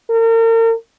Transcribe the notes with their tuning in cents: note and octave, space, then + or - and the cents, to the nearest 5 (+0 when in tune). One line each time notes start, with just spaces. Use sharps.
A#4 -40